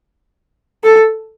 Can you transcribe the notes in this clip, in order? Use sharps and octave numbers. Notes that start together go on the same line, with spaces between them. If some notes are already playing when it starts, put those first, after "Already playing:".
A4